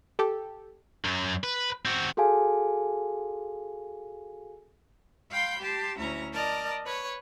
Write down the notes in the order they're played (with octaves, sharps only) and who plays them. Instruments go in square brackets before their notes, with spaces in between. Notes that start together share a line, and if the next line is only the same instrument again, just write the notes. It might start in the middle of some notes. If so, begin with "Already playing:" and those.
[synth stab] G4 A4
[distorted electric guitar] F#2 F#3
B4
C4 F#4
[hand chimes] F#4 G#4 A4 F5 G#5
[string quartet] F5 G5 B5 C6 G6
G4 A5 C6
D2 C#4 E4 A#5
A#4 D5 D#5 A5 F6
B4 C#5 C#6